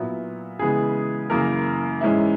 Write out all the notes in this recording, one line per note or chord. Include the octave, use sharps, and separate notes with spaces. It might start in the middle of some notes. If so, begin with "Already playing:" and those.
Already playing: A#2 F#3 B3 E4
C#3 E3 G#3 B3 G#4
F#2 C#3 E3 A#3 A#4
G#2 E3 G#3 C#4 E4